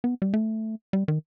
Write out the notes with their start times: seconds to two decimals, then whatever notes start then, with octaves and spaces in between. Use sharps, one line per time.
0.04 B3
0.22 G3
0.34 A3
0.93 G3
1.08 D#3